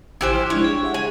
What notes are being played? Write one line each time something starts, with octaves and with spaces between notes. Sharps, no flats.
A1 E4 G4 C5 G#5 F#6
F3 F6 F#6
G#3 D4 E4 C#5
G#4
G4 E5 F#5
G#5